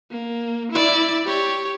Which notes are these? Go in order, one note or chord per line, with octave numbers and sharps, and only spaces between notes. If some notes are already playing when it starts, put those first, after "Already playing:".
A#3
E4 D5
G4 C#5